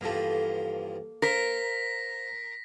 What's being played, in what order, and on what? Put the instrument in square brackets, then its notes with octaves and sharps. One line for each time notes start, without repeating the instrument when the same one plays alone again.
[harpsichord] E2 G2 F3 [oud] A#3 A4
[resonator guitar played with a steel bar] A#4 [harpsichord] C5 F5 [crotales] A#6 B6